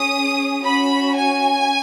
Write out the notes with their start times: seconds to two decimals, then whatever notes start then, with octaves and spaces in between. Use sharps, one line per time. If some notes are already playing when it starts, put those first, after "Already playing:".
Already playing: C#4 G#4 D#6
0.63 C#4 F#4 B5
1.17 G#5